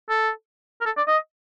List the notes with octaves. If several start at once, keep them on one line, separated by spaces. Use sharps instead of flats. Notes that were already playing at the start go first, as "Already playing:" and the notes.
A4
A#4
A4
D5
D#5